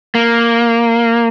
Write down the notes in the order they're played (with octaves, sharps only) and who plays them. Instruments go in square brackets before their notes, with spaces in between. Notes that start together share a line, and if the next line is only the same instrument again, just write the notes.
[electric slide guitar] A#3